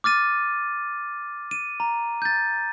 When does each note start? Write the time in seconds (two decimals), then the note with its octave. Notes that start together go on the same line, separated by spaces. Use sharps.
0.04 D6 F6 A6 D#7
1.51 D#7
1.80 A#5
2.22 G6 A6